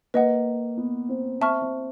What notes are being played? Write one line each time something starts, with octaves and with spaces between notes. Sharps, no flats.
A#3 B4 D#5 F#5
B3
C4
C4 E5 A5 C#6 F6
C4